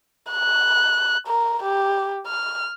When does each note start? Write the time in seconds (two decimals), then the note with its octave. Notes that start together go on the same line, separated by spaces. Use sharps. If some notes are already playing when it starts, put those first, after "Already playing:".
0.31 F#6
1.27 A#4
1.63 G4
2.27 F6